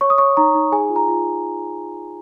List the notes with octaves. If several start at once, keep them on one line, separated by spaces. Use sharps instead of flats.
C#5 C#6
D#6
C#5 C#6
D#4 A#5
D#4
G#4 G#5
F4
A#5
F4